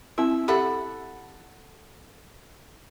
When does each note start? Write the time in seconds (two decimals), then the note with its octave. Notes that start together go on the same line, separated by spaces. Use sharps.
0.18 C4 E4 E5
0.48 G4 A4 E5 F#5 B5